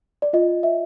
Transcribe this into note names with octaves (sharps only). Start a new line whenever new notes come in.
D5
F4 D#5
E5